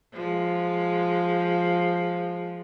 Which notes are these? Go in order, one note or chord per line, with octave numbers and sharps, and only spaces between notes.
F3 G#3